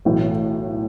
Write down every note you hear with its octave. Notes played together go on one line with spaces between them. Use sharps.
B1 A2 E3